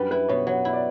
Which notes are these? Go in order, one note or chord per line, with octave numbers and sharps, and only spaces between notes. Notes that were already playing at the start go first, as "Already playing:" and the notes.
Already playing: F#2 G3 D4 B4
E4 B4
B2 C#5
F#3 C#5
E4
D5